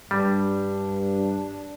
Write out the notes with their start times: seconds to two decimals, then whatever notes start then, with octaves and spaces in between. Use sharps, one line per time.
0.11 G2 G3 D4